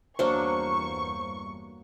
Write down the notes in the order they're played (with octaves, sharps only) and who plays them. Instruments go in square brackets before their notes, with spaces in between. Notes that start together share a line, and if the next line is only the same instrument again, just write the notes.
[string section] E2 G2 C#6 [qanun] F#3 A#3 D4 [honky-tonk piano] C5